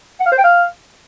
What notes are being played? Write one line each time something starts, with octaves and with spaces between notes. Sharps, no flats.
F#5
F5
C5
G5
F5